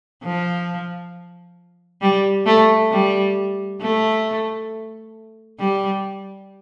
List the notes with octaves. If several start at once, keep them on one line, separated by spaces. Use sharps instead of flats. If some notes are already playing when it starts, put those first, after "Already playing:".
F3
G3
A3
G3
A3
G3